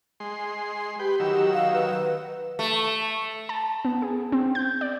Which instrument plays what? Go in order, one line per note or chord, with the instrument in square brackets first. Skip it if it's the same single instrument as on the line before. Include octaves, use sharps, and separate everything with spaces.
[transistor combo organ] G#3 C6
[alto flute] G4 [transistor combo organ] B4 G5
[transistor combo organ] D#3 F#3 E6
[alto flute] F5
B4
[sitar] A3
[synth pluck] A5
B3
G#4
C4
G6
D5